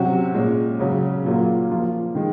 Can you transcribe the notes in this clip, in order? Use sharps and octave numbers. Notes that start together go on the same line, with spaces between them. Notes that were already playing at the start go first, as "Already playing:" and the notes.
Already playing: C3 F#3 C#4 F#4
A#2 G#3 C#4
C#3 F#3 C#4
A#2 F#3 A#3 F4
F3 A#3 F4
D#3 G#3